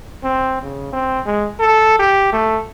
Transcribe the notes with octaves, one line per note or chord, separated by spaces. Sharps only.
C4
C#3
C4
G#3
A4
G4
A3